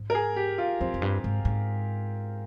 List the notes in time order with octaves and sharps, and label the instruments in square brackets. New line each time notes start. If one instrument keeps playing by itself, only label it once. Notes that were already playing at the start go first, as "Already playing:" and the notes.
Already playing: [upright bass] G#2
[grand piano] A#4
G#4
G4
F4
[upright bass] F2 [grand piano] C4
[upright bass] F2
G2
G#2
G#2